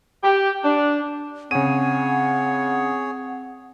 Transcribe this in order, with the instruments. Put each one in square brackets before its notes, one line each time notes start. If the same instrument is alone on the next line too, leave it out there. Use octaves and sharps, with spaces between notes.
[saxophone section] G4
D4
[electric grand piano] C#3 D#7 [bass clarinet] C4 [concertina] G#4 C#5 [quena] F#5